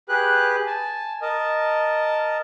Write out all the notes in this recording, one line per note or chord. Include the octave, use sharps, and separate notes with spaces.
G4 G#4 B4 F#6
G#5 A5
A#4 D#5 A5